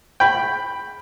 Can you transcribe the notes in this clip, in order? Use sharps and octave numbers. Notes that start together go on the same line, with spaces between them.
G5 B5